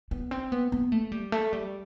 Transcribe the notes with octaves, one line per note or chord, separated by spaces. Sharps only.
B3
C4
B3
B3
A3
G3
A3
G3